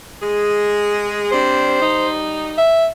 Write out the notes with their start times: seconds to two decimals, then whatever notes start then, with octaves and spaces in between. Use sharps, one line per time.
0.21 G#3 G#4
1.32 C3 G3 D4 C5
1.81 G3 D#4
2.58 E5